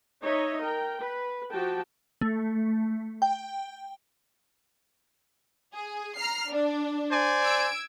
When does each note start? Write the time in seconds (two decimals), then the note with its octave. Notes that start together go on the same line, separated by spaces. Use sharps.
0.21 D#4 C#5 D#5 E5
0.61 A#4 G5
1.00 B4
1.51 F3 F#4 G4 G5 A5
2.21 A3
3.22 G5
5.73 G#4
6.16 A#5 F6 C7
6.50 D4
7.11 C5 D5 G#5
7.44 E6 G#6 D7